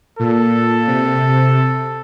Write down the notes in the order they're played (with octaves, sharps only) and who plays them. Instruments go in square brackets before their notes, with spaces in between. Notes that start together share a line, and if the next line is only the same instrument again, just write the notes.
[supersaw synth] A#2 [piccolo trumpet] A4
[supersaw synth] C3